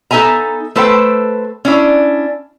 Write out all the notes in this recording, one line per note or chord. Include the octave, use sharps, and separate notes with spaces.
B3 D#4 A4 E5 G#5 A#5
A3 A4 B4 C5 E5 G5
C#4 D4 E4